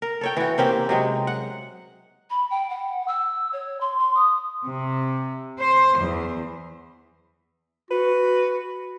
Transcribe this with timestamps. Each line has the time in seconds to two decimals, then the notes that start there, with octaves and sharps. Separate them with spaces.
0.02 A#4
0.21 A4 C#5 G5
0.37 E3 F#4
0.58 A#3 C4 C#4 G4
0.89 C3 F#3 G#3
1.27 F#5
2.30 B5
2.51 G5
2.70 F#5
3.08 E6
3.53 C#5
3.81 C6
3.99 C6
4.15 D#6
4.66 C3
5.60 C5
5.97 E2
7.91 F#4 B4